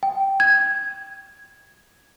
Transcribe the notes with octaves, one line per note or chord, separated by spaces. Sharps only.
G5
G#6